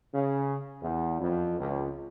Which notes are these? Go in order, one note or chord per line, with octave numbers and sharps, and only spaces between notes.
C#3
E2
F2
C#2